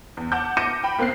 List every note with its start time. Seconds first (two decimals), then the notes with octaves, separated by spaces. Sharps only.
0.17 E2
0.32 F#5 A5 D6 G6
0.57 D6 G6 A#6 C#7 D#7 E7
0.84 G5 B5
0.98 B1 A#3 C4 F#6 C7